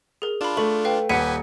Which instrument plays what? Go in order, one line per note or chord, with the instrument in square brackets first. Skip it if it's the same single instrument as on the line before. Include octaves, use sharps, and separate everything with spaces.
[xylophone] G#4 A#4
[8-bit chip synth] D4 F4 [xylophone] A5 B5
[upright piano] A3 [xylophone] C#6 F#7
[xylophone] B4 F5 G5
[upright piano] D#1 C#7 [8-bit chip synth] G4 B4 G#5 [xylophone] F#5 B6 D#7